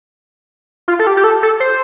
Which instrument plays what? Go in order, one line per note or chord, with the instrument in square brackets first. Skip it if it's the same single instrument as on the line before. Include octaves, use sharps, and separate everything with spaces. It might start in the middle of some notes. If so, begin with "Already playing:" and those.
[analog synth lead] F4
A4
G4
G4
A4
A4
C5